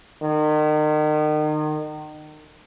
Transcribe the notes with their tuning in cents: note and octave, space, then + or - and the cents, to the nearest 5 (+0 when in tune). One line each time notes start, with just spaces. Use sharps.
D#3 -35